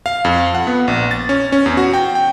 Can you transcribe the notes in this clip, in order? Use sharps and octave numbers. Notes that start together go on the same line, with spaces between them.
F5
F2
F#5
B3
A#1
A6
C#4
C#4
E2
F#4
G5
G5